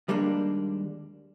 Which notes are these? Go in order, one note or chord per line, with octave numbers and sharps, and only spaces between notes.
D#2 G3 G#3 A#3 D4